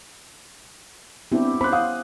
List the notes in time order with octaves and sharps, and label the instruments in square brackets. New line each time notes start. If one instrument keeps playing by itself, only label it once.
[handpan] B3 E4 G4 [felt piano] C4 D4
[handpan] C#4 C5 [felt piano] B5 D6 F#6
[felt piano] F5 F#5 D#6